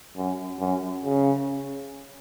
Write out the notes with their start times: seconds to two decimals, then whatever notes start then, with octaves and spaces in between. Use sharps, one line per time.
0.17 F#2
0.60 F#2
1.05 C#3